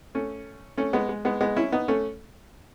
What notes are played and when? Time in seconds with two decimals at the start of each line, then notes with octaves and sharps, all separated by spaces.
0.15 A3 C#4
0.77 A3 C#4
0.93 G#3 B3
1.09 G#3
1.25 G#3 B3
1.41 G#3 B3
1.57 C#4 E4
1.72 B3 D#4
1.88 A3 C#4